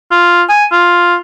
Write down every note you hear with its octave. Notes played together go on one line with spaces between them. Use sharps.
F4
G#5
F4